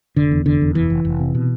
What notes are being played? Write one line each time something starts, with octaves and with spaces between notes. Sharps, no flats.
F1 D3
E2
F1 D3
E2
F1 E3
F1
F1
C3
B2